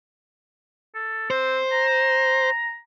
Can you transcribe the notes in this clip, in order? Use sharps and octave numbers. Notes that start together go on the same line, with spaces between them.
A4
C4 C5
A#5